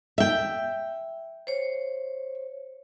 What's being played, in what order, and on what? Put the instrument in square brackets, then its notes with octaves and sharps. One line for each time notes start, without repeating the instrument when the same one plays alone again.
[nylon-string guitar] E5 G5
[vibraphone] C5 C#5